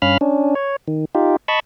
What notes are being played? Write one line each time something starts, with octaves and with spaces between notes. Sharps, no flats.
G2 C#4 F5 B5 F6
C#4 D4
C#5
D#3
D#4 F4 G4
D#5 A5 B5 C#6